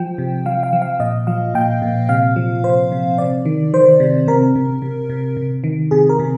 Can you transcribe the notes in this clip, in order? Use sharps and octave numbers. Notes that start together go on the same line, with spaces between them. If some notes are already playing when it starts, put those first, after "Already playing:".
Already playing: F3 G5
C3
F3 F5
F5
F3
F5
A#2 D#5
F3 F5
A#2 G5
A#2
C3 F5
F3
C3 C5
C3
C3 D5
D#3
D#3 C5
C3
C3 A#4
C3
C3
C3
C3
D#3
C3 G#4
A#4
C3